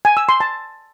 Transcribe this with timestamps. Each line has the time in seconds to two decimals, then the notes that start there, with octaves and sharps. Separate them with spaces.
0.05 G#5
0.17 E6
0.29 C6
0.40 A5